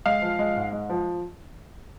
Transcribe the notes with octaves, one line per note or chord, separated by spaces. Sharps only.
G#3 F5
F3
G#3
G#2
G#3
F3